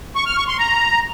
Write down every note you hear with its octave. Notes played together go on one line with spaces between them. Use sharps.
C#6
F6
C#6
C6
A#5